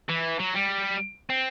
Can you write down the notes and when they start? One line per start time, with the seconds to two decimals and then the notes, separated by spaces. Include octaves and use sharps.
0.09 E3
0.39 F#3
0.55 G3
1.30 C4